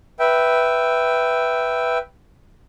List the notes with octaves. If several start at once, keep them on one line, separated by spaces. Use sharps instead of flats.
B4 E5 G5